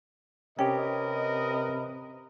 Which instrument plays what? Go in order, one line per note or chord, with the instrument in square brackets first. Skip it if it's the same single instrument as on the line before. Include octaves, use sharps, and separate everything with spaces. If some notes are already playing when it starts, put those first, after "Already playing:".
[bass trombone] C3 [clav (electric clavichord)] C#4 G4 [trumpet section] A#4 B4 D#5 [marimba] G5